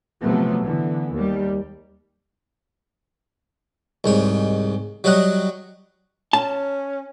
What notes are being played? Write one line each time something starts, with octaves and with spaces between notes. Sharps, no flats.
C3 F3 F#3 A3 B3
D3 E3 B3
D#2 G3
C2 G#2 C#5
F#3 G3 C#5 D#5 F#5
C#4 A5